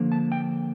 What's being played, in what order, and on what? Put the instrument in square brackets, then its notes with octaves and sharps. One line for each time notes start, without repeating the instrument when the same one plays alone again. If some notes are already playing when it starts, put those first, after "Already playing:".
Already playing: [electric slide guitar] D3 F3 A#3
A5
G5